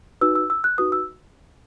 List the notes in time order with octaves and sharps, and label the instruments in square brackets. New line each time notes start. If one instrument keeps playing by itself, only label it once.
[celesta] D#4 F#4 B4 E6
E6
E6
F#6
D#4 F#4 B4 D#6
E6